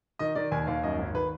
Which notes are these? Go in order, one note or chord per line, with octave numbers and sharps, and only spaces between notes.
D#3 D#5
D#3 D5
D#2 G#5
D#2 F5
F#2 D#5
G#1
D#3 B4